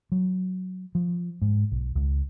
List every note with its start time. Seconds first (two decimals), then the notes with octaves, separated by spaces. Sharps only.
0.12 F#3
0.95 F3
1.42 G#2
1.72 B1
1.95 C#2